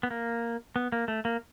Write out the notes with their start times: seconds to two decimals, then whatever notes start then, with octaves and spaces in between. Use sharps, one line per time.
0.03 B3
0.11 A#3
0.76 B3
0.92 A#3
1.08 A3
1.25 A#3